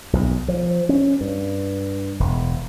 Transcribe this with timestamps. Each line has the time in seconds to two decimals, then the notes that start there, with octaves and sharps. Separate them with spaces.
0.13 B1
0.48 F3
0.89 C#4
1.21 G2
2.20 E1